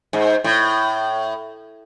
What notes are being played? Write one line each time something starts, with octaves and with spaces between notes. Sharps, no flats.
G#2
A2